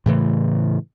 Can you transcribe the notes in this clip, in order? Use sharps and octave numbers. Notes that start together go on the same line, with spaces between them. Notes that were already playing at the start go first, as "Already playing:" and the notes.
A2 C#3 E3 A3